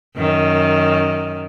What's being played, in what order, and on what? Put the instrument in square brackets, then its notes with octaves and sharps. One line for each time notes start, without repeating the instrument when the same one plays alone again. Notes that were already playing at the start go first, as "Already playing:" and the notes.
[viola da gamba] F#2 D#3